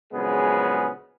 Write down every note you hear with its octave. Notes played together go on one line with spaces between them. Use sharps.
A#1 C#3 F#3 G#3 B3 G#4